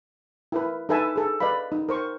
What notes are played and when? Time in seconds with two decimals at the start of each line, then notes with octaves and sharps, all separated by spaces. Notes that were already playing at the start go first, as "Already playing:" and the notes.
0.52 E4 A#4 B4
0.89 D#4 A4 B4 E5 G#5 A5
1.16 G#4 A4
1.40 B4 D5 D#5 F5 B5
1.72 D#4
1.89 A#4 C5 C#6